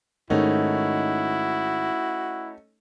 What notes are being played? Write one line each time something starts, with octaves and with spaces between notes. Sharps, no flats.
G#2 D#3 A3 C#4 D#4 E4 F#4